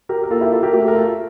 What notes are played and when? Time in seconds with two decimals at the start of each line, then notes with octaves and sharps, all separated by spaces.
0.09 G4 A#4
0.23 A#4
0.30 A#3 F4 A4
0.41 E4 G4
0.52 F4 A4
0.63 G4 A#4
0.73 A3 G4 A#4
0.88 A#4
0.95 F4 A4